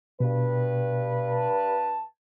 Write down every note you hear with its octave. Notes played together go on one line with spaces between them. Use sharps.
G2 B2 B4
A5